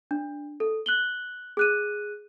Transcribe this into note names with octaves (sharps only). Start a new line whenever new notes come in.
D4
A4
F#6 F#7 G7
G#4 F#6 D#7